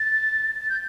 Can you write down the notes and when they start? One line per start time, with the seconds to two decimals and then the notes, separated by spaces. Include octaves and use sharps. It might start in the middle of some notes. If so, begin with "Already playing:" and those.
Already playing: A6
0.61 A6
0.69 G6